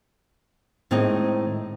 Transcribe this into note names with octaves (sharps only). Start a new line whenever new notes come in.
A2 D#3 G#3 C4 D#4 D#5